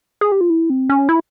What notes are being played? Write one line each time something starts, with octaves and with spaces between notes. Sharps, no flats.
G#4
G4
F4
E4
C4
C#4
E4